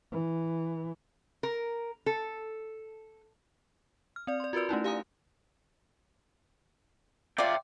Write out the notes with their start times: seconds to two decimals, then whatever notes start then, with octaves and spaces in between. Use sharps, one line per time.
0.12 E3
1.43 A#4
2.06 A4
4.16 F6
4.27 C4 D5
4.40 D5 C6
4.53 F4 F#4 A#4 B4 D5
4.69 A3 C#4 D#4 E4
4.84 G4 F5 G#5 A#5 D#6
7.38 F4 D5 E5 G5